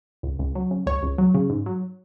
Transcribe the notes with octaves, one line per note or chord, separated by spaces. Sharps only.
C#2
C#2
F#3
C#3
C#2 C#5
C#2
F#3
C#3
G#2
F#3